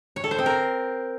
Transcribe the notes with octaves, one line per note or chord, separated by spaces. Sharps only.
C#5
A4
C5
C4
A#4